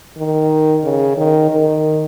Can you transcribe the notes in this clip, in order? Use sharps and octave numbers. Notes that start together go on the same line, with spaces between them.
D#3
C#3
D#3
D#3